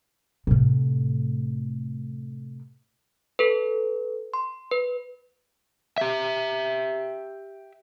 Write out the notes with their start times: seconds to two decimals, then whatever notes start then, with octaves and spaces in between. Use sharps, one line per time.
0.47 A2 C3
3.39 A4 B4
4.34 C6
4.71 B4
5.98 G4 E5